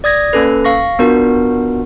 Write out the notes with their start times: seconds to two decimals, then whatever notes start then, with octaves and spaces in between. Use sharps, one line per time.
0.04 D5 D#6 G#6 A#6
0.33 A#3 C#4 A4 B4
0.64 F5 C#6 A#6
0.99 B3 D4 F4 F#4 A#4